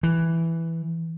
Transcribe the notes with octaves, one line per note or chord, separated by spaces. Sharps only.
E3